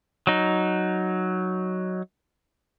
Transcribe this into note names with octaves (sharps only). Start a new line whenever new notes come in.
F#3 D#4